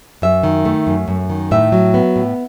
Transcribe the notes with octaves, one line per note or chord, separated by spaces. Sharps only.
F#2 E5
D#3
A3
F#2
F#2
D#3
A2 E5
F#3
B3
A2